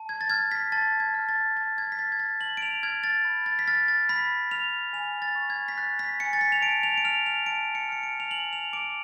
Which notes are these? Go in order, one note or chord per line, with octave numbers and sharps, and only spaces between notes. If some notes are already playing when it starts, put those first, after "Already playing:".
Already playing: A5
G#6
A6
F6 G#6
B6
A5 A6
G#6
F6
A6
A5 A6
G#6
B6
F6 A6
G#6
A6
A5 F#7
D7
F7
F6 G#6
A6
B5
A6
B6
F6 A6
A6
B5 B6
F6 F7
G#5 F7
A6
C#6
G#6
B6
F#6 A6
B6
G#5 C#7
A6
B6
F7
A5 D7
F7
D7
F6 F7
F7
A5 D7
C#7
F6 C#7
D7
F7
G#5 F#7
F7
D6 D7